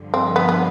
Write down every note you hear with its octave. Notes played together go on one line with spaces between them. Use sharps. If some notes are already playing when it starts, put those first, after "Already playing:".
Already playing: G2 D3 F3
C4
B3
B3